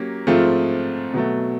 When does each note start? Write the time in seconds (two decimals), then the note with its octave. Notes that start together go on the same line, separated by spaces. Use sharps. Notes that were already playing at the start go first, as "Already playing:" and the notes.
Already playing: F#3 A#3 C#4 G4
0.27 G#2 F3 A3 C4 F4
1.14 B2 F#3 A3